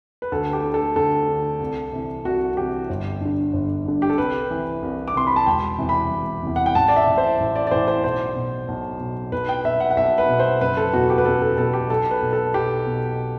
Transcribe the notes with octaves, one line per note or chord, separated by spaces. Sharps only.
B4
D2 A4
G4
D3
A4
D2 A4
D3
C2
C3 E3
C2 F#4
C3 E3 G4
G1
G2 D3
G1
G2 D3
G4
A4
C2 B4
C3 E3
C2
D6
C3 E3 C6
B5
A5
E1 G5
E2 C3 E3
B5
E1
E2 C3 E3
F#5
G5
A1 A5
D5
E5
A2 E3
C5
A1
D5
D5
A2 E3 C5
C5
B1 C5
B2
B1
B2
B1 B4
G5
B2 E5
F#5
F#5
B1 E5
B4
B2
C5
F#1 B4
A4
E2 B2 F#4
G4
B4
F#1 A4
A4
E2 B2 A4
G4
B1 A4
B4
B2
A4
B1 G4
B2